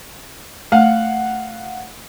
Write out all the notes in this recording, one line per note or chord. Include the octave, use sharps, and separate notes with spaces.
A3 F5 F#5